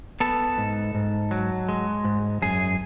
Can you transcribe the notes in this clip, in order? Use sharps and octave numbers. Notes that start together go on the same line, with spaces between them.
B3 A4
G#2
G#2
F#3
G#3
G#2
F#2 G#4